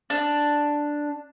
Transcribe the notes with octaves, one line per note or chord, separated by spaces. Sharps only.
D4